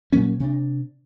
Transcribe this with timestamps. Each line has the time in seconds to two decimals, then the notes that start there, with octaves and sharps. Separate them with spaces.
0.13 A#2 F#3 A#3 C#4
0.40 C3 D4